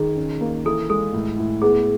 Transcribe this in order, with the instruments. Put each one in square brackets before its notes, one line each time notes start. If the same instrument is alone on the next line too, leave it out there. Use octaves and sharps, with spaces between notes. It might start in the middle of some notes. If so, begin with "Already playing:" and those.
Already playing: [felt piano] D#3 [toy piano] G#4
[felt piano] C#4
A#3
[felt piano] E3 [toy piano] A4
[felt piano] G#3 [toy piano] A4
[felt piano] A2
A2
[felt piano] B3 [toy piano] G#4